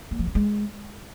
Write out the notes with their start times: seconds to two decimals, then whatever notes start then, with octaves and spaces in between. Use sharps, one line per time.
0.11 A#3
0.19 F3
0.27 B3
0.35 G#3